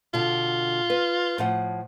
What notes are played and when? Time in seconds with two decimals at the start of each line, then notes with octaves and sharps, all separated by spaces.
0.14 B2 D3 F4
0.90 B4
1.38 A2 F3 F#5